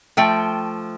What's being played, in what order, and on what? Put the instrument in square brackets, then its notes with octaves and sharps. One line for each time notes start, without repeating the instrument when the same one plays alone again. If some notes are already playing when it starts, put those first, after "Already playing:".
[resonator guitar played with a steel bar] F3 A3 G5